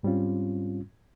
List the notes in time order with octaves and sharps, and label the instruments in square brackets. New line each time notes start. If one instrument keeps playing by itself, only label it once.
[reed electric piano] G#2 G3 C4 C#4 F4